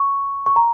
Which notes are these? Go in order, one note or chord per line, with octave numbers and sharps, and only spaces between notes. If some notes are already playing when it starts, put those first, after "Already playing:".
Already playing: C#6
C#6
A#5